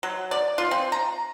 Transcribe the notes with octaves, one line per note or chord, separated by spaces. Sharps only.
F#3
D5
F4
C4
A#5